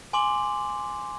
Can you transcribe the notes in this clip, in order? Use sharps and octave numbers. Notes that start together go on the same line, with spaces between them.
G#5 C6 D6 F#7